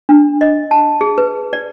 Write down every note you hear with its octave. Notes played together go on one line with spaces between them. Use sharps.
D4
D#5
A5
G#4
B4
D5